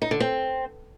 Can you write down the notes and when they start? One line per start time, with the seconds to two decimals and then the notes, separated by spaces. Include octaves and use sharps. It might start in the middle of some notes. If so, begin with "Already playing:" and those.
0.02 D#4
0.11 D3
0.20 C4